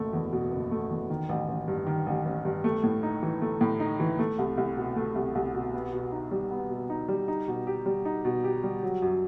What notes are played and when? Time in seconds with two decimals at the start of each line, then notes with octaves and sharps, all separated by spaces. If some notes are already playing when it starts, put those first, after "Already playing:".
Already playing: F#1 B2 A3
0.13 E2
0.32 B2
0.52 F#1
0.71 A3
0.90 E2
1.10 D#3
1.29 A1
1.48 A1
1.68 G2
1.87 D#3
2.06 A1
2.25 A1
2.45 G2
2.64 A3
2.84 A2
3.03 D#4
3.23 E3
3.42 A3
3.61 A2
3.80 D#4
4.00 E3
4.19 A3
4.38 C2
4.57 C2
4.77 B2
4.96 A3
5.15 C2
5.35 C2
5.54 B2
5.74 B3
5.92 B2
6.12 D#4
6.31 G3
6.51 B3
6.70 B2
6.90 D#4
7.08 G3
7.28 D#4
7.48 B2
7.67 G4
7.86 G3
8.05 D#4
8.25 B2
8.44 G4
8.64 G3
8.83 F#3
9.02 F#2